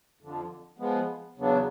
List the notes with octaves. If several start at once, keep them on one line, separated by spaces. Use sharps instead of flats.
F2 D3 F3
F3 G#3 B3
E2 C#3 F#3 B3 D4